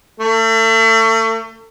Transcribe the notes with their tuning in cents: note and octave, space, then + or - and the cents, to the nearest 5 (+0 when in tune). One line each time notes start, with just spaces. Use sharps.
A3 +35